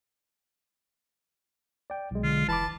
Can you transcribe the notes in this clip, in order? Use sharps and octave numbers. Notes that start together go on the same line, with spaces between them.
D5 G5
B1 G#3
D3 F4
F1 E3 A5 B5 D6